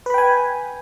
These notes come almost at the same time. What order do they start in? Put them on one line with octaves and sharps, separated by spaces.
B4 B5 G5 G#5